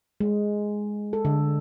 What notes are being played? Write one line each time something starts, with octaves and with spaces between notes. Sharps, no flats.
G#3
A4
D3